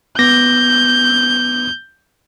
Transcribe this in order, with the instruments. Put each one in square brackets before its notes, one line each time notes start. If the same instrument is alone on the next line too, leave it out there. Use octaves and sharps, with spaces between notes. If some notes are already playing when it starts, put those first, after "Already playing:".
[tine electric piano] B3 D6 A#6 [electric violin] G6